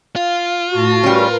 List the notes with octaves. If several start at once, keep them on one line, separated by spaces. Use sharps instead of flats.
F4 F5
A2 F#4 A5
G3 C#4 A#4 B4